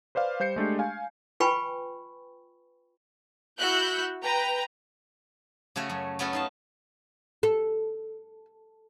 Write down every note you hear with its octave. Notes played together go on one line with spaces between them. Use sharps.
B4 C5 D5 F5
G3 C5 G6 C7 C#7
G#3 A3 D4 G4
F5 G#5
F4 B4 G5 G#5 B5 C#6
E4 F#4 E6 F#6 G6
B4 G5 A#5
C#3 A3 F#4 C#5
F#2
A3 B3 C#4 F#4 A4
D#4 F5 A5
A4